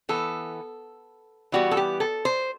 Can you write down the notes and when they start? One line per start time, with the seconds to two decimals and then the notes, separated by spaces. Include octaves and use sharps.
0.09 E3 B3 A4
1.52 E3 G3 B3 F#4
1.71 A4
1.77 G4
2.00 A4
2.25 C5